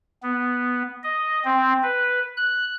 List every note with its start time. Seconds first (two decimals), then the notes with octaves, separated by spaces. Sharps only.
0.23 B3
1.03 D#5
1.45 C4
1.83 B4
2.37 F#6